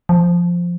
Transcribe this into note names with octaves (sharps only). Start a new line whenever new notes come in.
F3